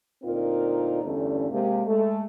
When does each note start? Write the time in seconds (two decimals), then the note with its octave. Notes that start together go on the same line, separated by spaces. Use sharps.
0.23 D2 A#2 C4 D#4 F4 A#4
1.02 E2 G2 D3 A3 C#4
1.49 C3 G#3 A#3
1.85 G#3 A3